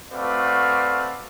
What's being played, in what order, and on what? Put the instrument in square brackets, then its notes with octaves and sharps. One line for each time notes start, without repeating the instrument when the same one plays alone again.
[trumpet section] A3 C4 F#4 B4 D5 F5